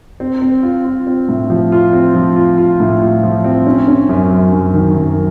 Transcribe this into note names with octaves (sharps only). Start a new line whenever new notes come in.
C4
C4
F4
F4
C4
A2
F3
F4
C4
F3
F4
F4
A2
F4
F3
C4
C#4
C#4
F#2
F#2
F#2
D#3
F#2